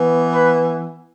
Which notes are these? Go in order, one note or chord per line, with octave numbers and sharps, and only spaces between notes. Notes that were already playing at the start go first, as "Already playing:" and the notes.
Already playing: E3 B3
B4